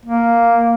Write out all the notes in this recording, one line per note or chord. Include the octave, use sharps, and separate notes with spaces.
A#3